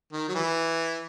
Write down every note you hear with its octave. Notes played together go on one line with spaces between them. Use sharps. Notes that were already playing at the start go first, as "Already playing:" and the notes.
D#3
F#3
E3